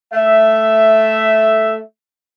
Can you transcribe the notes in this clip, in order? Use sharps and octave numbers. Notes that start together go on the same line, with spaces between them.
A3 E5